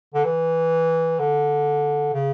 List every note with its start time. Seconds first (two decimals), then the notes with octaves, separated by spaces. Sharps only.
0.14 D3
0.24 E3
1.19 D3
2.13 C#3